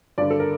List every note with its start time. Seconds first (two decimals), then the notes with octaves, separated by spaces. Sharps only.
0.18 G2 D3 D5
0.31 A4
0.40 A#4